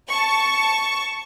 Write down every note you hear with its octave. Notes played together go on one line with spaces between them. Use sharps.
A5 C#6